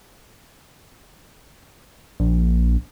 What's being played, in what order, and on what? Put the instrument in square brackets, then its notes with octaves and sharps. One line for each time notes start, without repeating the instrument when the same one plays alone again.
[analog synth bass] A#1